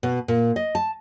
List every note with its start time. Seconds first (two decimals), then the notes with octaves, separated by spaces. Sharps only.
0.03 B2
0.28 A#2
0.56 D#5
0.75 A5